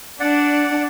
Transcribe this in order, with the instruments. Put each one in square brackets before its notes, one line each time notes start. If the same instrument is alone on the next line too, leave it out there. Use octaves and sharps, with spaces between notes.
[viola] D4 [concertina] D5 F#5